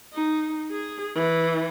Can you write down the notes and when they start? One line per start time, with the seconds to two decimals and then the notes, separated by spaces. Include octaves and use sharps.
0.13 D#4
0.71 G#4
1.15 E3